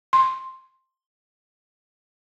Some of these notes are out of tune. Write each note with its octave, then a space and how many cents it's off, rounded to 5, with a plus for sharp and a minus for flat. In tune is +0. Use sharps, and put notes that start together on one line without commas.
C6 +10